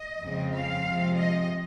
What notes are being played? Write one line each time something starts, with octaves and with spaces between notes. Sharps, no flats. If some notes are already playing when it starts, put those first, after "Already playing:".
Already playing: D#5
F2 C#3 G#3 C4
F5
C3 F3 G#3 C4
D#5